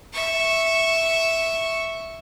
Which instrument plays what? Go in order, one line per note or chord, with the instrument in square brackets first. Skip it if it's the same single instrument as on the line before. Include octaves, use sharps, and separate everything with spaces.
[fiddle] E5 C#6